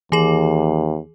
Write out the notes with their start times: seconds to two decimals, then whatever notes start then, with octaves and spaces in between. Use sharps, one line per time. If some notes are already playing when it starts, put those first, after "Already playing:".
0.12 D#2 E3 G#4